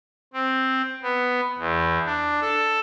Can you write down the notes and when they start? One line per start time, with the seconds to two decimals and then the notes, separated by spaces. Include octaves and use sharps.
0.33 C4
1.02 B3
1.59 E2
2.05 D4
2.41 A4